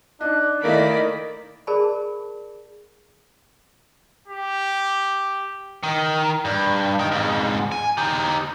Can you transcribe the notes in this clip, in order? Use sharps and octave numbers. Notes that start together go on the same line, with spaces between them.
D4 D#4 F#6
D#3 A3 A#3 E4 A#4 D5 D#5 B5
G#4 A#4 C5 D5 A5 B5
G4
D#3
G2
D#4 G5
F2 G#2
G#5
D#4 G4